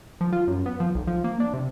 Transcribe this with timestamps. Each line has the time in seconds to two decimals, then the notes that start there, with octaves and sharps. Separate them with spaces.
0.21 F3
0.33 F4
0.47 F#2
0.66 B3
0.80 F3
0.95 B1
1.07 F3
1.24 A#3
1.40 D4
1.54 C3